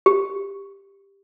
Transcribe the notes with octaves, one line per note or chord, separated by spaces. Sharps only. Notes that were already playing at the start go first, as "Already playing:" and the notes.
G4